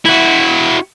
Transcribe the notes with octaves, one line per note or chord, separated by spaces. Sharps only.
E4 F#4